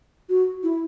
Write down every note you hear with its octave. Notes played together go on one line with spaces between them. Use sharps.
F#4
E4